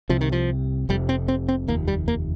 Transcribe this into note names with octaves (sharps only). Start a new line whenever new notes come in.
C2 C3 F3
D#3
F3
F1 F2 C3 G3
C4
C4
C4
F1 D#2 A#3
G3
A#3